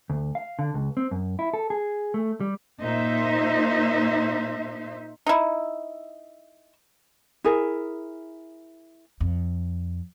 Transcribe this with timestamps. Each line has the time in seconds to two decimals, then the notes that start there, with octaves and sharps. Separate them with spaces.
0.10 D2
0.35 F5
0.59 D3
0.74 C#2
0.97 C4
1.11 F#2
1.39 E4
1.53 A4
1.70 G#4
2.14 A3
2.41 G3
2.81 A#2 D#4 C5 E5
5.27 D#4 E4
7.44 E4 G#4 A#4
9.20 F2